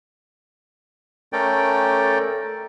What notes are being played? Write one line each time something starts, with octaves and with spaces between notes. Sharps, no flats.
A3 C#4 A4 A#4 D5 G5